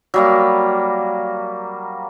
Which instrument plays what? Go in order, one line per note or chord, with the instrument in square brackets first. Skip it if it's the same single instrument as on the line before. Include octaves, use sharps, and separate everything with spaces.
[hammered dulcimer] F#3 G3 A#3